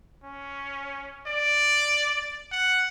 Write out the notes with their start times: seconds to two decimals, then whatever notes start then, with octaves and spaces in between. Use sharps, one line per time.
0.24 C#4
1.28 D5
2.52 F#5